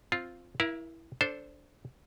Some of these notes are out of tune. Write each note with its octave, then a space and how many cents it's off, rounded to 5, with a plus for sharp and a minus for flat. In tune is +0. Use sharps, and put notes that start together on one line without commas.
C4 +0 F4 +0
E4 +0 A#4 +30 F5 -45
D4 -15 A4 +0 C5 +0